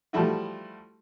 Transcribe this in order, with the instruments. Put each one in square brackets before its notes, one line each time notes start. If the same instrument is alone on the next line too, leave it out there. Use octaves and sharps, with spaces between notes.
[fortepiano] F3 G3 A3 E4 F#4